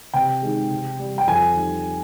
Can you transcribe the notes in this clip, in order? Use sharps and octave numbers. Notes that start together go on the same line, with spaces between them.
C3 G5
D#3 G#3
C3
G3
G5
F2 G#5
D#3 G3